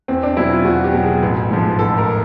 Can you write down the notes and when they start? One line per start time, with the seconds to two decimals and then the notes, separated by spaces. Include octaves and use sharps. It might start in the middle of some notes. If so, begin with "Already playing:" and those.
0.08 E2 C4
0.23 D4
0.37 B2 F#3 E4
0.52 F4
0.65 E2 F#4
0.84 G4
0.94 B2 F#3
1.03 G#4
1.22 A1
1.51 G#2 F3
1.78 A1 A4
1.98 A#4